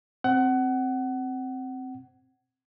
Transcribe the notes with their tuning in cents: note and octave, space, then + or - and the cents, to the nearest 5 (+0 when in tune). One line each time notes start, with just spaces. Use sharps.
C4 +0 F#5 +25